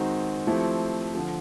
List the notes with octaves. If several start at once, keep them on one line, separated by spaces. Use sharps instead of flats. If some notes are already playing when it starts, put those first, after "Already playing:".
Already playing: D#3 G#3 C4 D#4 F#4
F3 A3 C4 E4 G4
D3 F3